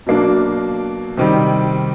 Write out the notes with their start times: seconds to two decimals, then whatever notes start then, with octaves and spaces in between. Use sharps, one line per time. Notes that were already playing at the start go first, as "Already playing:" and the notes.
0.06 B2 F#3 A#3 D4
1.17 C3 D#3 G3